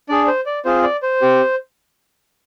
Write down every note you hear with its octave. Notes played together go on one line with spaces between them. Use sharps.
D4 G#4 D5
C5
D5
C4 F4 G#4 C5
D5
C5
C4 G4